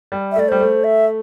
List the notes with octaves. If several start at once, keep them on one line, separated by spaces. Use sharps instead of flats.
G3
E5
A3 D5
G3 C5
A3
E5